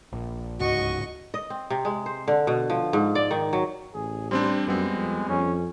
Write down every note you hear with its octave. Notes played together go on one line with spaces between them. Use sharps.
A#1
D1 C#2 G#2 F#4 D#5 C#6
D#5
C4
C3
G#3
C5
D3
B2
F3
G#2
D5
D#3
F#3
A1 G#4
G3 C4 D4 C5
F#2 G3 G#3 B3 C4
F2
F2 C#4